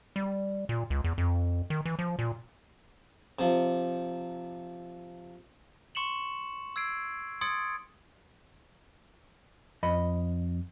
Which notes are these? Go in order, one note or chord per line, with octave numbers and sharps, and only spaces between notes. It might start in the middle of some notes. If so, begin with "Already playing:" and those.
G3
A#2
C#2
E2
F2
D#3
E3
F3
A#2
C3 F3
C6 C#6 C#7 E7 F#7
E6 G#6 C7 D7
C6 D#6 G#6 A6 C#7 D7
F2 D#5 B5